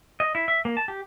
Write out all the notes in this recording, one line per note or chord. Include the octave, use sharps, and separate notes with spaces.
D#5
E4
E5
A#3
A5
G4